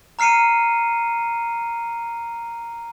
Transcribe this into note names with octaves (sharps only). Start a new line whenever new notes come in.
A#5 F6 C7 C#7 D#7